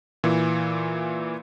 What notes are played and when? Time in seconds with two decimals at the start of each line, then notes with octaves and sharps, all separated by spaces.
0.24 A#2 E3